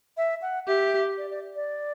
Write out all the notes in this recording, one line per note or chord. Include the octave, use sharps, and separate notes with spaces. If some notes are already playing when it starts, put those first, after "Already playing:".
E5
F#5
G4 E5
D5
D5
D5